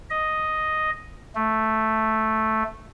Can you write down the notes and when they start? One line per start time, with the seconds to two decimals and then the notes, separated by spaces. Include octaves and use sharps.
0.10 D#5
1.35 A3